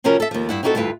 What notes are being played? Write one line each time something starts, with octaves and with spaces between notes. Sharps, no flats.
C3 F3 C#4 F#4 A#4 B4
A4 E5
D#2 F3
G2 E4 F#5
C4 D#4 E4 F#4 G4 A4
D2 G2 E4 F4 B4